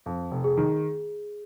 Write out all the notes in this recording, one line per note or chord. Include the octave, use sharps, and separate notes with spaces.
F2
F1
G#4
D#3